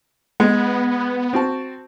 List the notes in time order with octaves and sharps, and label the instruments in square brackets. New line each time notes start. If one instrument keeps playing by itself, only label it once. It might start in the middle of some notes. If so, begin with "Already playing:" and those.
[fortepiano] G#3 [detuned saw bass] B3
[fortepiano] C4 F#4 A5